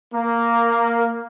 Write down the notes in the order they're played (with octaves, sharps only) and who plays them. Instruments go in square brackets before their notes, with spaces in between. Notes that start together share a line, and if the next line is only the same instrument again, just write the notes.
[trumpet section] A#3